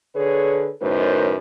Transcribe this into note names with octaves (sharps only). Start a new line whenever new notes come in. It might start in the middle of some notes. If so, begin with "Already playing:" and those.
D3 G#4 A4 B4 C#5
F#2 A2 D#3 B4 C5